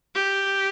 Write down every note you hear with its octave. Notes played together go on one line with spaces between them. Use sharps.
G4